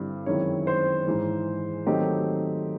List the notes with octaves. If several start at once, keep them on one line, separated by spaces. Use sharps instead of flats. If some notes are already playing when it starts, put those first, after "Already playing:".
Already playing: G2 D3 G3 C4 E4
F#2 D#3 G#3 C4 E4 C#5
C5
G#2 E3 G#3
D#3 F#3 A3 C4 D#4 G4